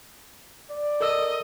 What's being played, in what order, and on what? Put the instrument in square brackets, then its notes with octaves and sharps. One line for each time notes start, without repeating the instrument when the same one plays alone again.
[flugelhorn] D5
[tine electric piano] A4 A#4 E6 [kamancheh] D#5